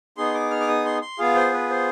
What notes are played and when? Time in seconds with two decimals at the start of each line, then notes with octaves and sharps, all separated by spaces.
0.17 B3 D#4 G#4 C6
0.34 D6
0.51 F6
0.60 D6
0.68 D#6
0.85 C6
1.02 C6
1.19 B3 F4 G#4 F5
1.35 C5
1.53 B4
1.70 C5